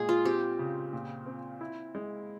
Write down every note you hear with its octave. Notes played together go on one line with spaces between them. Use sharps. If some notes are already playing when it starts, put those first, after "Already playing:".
Already playing: A#2 G#3 G#4
F4
C4 G4
C#3
A#2
C4
E4
G#3